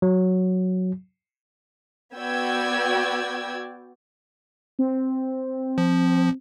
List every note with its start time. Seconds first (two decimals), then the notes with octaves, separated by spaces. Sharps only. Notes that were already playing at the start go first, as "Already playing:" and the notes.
0.02 F#3
2.16 B3 F#4 D5 G5 E6 G#6
4.79 C4
5.78 F3